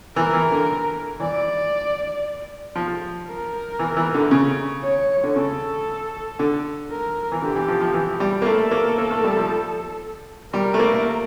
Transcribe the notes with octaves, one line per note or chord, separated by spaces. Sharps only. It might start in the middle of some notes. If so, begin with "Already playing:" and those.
E3 A#4
E3
D3
E3 D5
F3
A#4
E3
E3
D3
C#3
C#5
D3
C#3 A4
D3
A#4
E3
D3 G4
E3
F3
F3
E3
G3
A#3
A3 A4
A#3
A#3
A3
G3
F3
G3 A#4
A3
A#3